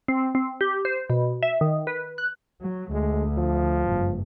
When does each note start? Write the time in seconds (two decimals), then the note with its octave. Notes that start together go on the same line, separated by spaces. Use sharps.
0.08 C4
0.35 C4
0.61 G4
0.85 C5
1.10 B2
1.43 E5
1.61 D#3
1.87 B4
2.18 F#6
2.61 F#3
2.92 D2 G#3
3.38 F3
3.87 F#1 G2